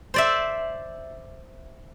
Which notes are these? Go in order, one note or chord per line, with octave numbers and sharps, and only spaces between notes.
C5 D5 E5